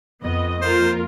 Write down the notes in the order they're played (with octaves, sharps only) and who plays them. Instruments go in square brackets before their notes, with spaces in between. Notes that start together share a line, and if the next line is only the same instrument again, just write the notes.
[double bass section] F2 [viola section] B3 D#5
[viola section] A#3 F4 A#4 [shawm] C5